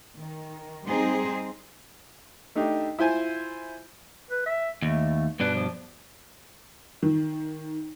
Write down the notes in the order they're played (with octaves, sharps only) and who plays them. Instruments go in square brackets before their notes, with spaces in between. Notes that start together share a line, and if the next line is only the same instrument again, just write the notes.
[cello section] D#3
G3 C4 D#4 G#4 C5
[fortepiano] A3 D4 D#4 G4
E4 F4 C5 G#5
[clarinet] B4
E5
[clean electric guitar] D#2 [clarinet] A3
[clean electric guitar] G2 B2 D4 [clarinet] B4
[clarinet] F3
[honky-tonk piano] D#3